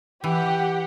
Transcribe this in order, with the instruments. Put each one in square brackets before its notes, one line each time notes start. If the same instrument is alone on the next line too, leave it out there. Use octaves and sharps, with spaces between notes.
[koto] E3 [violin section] G4 F#5